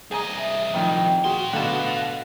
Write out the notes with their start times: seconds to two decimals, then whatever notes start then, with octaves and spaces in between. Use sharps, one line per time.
0.11 C2 G#4 D#5 G#5 A#5
0.38 E5
0.74 F2 A#2 D#3 G5
1.25 A#2 F#4 G#4 C6
1.53 B2 D3 B4 F5 A5